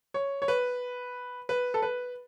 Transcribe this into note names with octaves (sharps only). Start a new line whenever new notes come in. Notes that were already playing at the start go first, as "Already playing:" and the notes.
C#5
C#5
B4
B4
A4
B4